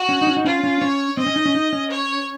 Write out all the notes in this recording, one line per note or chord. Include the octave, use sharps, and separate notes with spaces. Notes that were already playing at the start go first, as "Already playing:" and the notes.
Already playing: F#4
C#4
D#4
C#4
D#4
C#4 F4
C#4
C#4 C#5
C4 D#5
C#4
D#4
C#4
D#4
C#4
C#5